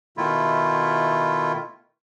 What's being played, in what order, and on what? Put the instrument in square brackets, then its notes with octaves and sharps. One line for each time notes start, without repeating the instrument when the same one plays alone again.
[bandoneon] B2 D#3 A3 E4 F4